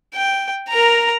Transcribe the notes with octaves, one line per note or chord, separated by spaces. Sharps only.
G5
A#4 A#5